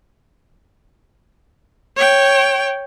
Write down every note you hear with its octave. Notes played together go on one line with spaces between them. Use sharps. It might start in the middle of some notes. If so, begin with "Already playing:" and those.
C#5 G5